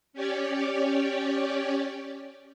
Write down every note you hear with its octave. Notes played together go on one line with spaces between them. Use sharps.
C#4 G4 C#5 D5